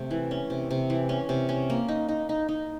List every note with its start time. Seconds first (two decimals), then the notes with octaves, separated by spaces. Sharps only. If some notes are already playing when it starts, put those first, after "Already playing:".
Already playing: C3 A3
0.11 E3
0.31 C#4
0.50 C3
0.71 C3
0.90 E3
1.09 C#4
1.29 C3
1.49 C#4
1.70 A#3
1.88 D#4
2.09 D#4
2.29 D#4
2.49 D#4